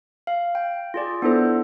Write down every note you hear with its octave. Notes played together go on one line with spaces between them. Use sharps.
F5
G5
F4 G#4 D5
B3 D4 E4 A4 C5